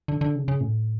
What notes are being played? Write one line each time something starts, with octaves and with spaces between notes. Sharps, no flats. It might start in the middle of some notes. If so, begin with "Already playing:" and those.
D3
D3
C#3
C#3
A2